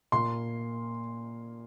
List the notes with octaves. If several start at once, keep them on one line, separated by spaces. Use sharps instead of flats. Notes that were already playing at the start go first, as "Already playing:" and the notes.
A#2 A#3 C6